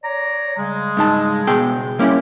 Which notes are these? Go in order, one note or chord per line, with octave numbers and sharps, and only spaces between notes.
C#5 D5 A#5
C#3 G3 G#3
G#2 D#4 A5
B2 G#4 G5
F#3 G3 A#3 C#4 E4 G4